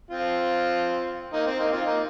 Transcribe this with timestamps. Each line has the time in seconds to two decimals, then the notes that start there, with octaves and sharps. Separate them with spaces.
0.10 C4 F4
1.33 A#3 D#4
1.46 C4
1.60 A#3 D#4
1.72 C4 F4
1.86 A#3 D#4